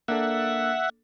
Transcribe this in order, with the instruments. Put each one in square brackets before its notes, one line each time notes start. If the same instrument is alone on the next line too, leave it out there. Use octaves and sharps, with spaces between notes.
[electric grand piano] A#3 D4 A4 [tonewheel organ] E5 F#5